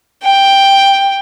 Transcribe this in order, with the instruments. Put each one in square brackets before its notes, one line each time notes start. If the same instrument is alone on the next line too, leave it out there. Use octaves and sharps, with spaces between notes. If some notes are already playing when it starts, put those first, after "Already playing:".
[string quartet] G5